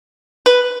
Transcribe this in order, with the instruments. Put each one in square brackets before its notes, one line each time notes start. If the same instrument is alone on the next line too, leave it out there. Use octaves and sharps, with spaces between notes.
[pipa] B4